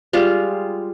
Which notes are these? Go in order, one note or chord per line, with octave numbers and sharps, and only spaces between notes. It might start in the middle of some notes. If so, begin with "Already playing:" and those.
G3 G#3 F4